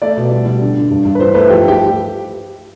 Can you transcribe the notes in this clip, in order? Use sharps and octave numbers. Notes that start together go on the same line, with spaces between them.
A3 D5
B2
G3
G3
D3
D3
G2
G2
B4
E3 C5
A3 B4
F3 G4
G4